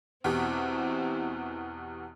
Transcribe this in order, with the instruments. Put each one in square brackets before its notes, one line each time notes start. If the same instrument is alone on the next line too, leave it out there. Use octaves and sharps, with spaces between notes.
[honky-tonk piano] E2 B2 G4 [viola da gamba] C4 E4